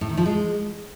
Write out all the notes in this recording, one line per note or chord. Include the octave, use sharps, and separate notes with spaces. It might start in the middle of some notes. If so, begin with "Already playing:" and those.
A2
D#3
F3
G#3